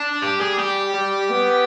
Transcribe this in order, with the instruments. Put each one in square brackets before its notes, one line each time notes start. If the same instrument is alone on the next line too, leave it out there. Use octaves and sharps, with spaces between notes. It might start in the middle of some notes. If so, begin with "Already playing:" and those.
Already playing: [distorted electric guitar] D4
[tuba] G3 [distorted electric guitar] G4
[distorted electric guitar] G#4
G4
[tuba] G3
B3